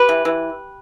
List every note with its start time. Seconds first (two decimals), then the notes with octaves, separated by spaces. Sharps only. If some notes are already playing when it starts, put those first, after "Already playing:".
Already playing: G4 B4
0.09 E3
0.25 E3